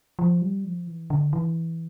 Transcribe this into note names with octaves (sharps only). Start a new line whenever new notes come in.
F3
G3
F3
E3
D3
E3